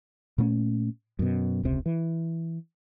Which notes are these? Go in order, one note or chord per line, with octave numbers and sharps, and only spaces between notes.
A#2 A3 C4 C#4
F#2 B2
E1 C#2 C3
E3